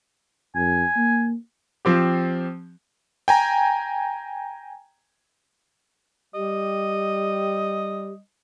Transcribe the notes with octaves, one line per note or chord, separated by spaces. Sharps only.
F2 G#5
A#3
F3 C4 G4
G5 G#5 A#5
G3 G4 D#5